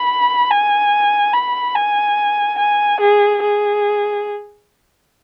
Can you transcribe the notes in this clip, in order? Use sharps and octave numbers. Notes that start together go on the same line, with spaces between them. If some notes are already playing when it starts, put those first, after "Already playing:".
Already playing: B5
G#5
B5
G#5
G#5
G#4
G#4